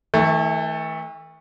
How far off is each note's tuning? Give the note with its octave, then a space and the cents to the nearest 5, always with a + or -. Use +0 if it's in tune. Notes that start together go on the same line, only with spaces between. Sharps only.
E3 -45 A3 +0